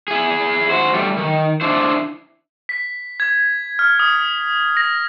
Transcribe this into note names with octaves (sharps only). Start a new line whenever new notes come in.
E4 G#4
F#4 C5
G3 A3
D#3
D4 E4 C5
B6
G#6
F6
D#6
A#6